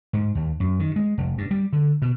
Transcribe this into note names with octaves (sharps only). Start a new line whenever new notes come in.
G#2
D#2
F#2
D#3
G#3
F1
G2
G3
D3
B2